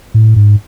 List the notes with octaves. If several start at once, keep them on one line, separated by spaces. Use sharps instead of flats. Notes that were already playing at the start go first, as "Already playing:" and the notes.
A2
G#2